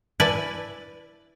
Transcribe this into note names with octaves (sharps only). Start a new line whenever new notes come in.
E4 B4 D5 G#5 A5